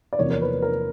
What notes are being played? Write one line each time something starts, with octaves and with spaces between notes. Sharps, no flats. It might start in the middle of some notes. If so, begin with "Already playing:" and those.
D5
E2 C3 F3 A#3 C#5
A#4
B4
A#4